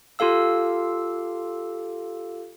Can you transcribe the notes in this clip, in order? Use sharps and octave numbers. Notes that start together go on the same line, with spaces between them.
F4 G4 A4 F5 E6